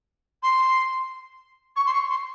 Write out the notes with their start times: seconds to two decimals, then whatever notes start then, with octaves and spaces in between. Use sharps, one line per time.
0.43 C6
1.76 C#6
1.86 C6
1.93 C#6
2.10 C6